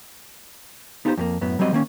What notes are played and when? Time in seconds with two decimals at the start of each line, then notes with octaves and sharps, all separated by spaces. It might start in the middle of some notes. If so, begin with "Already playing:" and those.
1.05 B3 D#4 F4 G4 G#4 C5
1.18 F2 A3 A#3
1.41 F#2 A2 B3
1.59 F#3 G3 C4 C#5 D#5
1.73 D#3 A#3 C#4